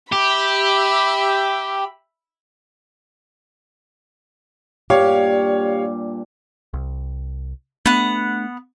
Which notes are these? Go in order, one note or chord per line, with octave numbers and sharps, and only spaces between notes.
G4 E5 B5
G2 A#2 G4 C#5 F5 D6
C2
A3 B3 D4 F#5